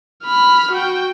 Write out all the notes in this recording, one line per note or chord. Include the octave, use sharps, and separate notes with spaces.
B5 F6
F#4 G5